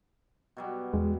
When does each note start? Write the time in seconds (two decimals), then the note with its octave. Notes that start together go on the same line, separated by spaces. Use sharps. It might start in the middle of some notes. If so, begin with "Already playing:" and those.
0.57 B2 F#3 G3
0.94 E2 G#3